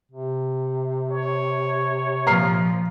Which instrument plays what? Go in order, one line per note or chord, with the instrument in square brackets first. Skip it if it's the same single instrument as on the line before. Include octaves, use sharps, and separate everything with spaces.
[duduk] C3
[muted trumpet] C#5
[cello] A#2 F3 [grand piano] A#5 F6 C7